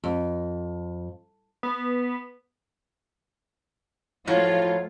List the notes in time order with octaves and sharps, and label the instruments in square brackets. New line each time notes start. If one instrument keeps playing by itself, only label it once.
[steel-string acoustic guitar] F2
[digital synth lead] B3
[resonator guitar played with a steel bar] A2 F#3 [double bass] F3 A3 [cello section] F4 [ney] C#5